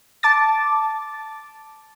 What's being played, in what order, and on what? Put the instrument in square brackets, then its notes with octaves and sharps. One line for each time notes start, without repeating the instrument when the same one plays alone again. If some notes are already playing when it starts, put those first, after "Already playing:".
[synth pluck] A5 D6 A6